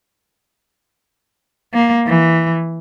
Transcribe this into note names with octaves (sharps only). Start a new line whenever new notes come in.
A#3
E3